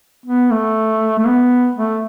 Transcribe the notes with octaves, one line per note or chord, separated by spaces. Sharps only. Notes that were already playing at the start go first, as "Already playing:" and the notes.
B3
A3
A3
B3
A3